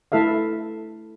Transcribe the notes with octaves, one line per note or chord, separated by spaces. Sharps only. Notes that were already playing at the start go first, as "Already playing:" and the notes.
A3 E4 A4 E5 F5